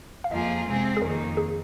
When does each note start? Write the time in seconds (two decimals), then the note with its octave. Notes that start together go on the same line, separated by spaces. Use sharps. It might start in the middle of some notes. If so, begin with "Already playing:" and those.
0.24 F5
0.31 F2 F3 A#3 F4 G#4 D#5
0.66 C3 G#3 C4 G#4
0.97 G#4
1.02 F2 D#3 A#3 D#4 A#4
1.37 G#4